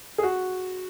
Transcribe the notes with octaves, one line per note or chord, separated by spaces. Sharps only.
G#4
F#4